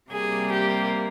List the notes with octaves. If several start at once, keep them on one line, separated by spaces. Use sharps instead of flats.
C3 G3 A#3 G#4
G4